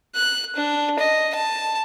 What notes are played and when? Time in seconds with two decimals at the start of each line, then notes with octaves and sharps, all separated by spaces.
0.15 F#6
0.56 D4
0.99 D#5
1.35 A5